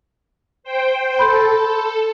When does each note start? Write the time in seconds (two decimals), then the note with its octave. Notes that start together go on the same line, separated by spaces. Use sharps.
0.63 C5 G5
1.19 A4 B5 C6 G6